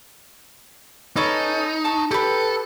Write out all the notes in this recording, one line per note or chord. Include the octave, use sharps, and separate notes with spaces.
C#4 D#4 A4 B4
A5 C#6
G4 A4 B4